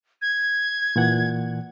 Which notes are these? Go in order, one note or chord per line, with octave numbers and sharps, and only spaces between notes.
G#6
A#2 E3 F#5